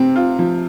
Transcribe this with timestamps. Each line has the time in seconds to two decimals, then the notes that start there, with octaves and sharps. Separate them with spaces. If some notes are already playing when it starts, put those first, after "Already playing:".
Already playing: C3 C4
0.16 F4
0.39 F3